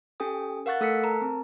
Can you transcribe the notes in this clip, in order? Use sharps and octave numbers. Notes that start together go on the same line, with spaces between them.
C#4 G4 A4 G5 G#5 D#6
A#4 F5 F#5 C#6 F#6 A6
A3 A4 E6 F#6 B6 C#7
A#4 A5 A#5
C4